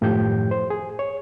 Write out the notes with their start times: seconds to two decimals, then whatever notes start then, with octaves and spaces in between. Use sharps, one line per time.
0.01 F#2 A2 D#3 F3 G4 G6
0.51 C5
0.70 G#4
0.99 C#5